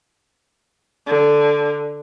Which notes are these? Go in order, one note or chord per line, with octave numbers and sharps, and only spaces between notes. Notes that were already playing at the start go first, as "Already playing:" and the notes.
D3